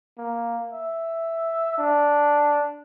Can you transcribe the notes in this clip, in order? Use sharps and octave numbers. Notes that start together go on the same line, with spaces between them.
A#3
E5
D4